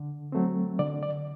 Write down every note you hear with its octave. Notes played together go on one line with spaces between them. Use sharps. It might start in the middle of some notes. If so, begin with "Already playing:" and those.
Already playing: D3
F#3 A3 C4
D3 D5
D5